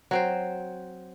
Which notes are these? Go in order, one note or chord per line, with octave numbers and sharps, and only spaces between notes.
F#3 C4 C5